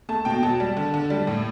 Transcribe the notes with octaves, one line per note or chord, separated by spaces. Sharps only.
A3 A5
B2 G5
F#3 A5
G3
D3
D3
G3
A2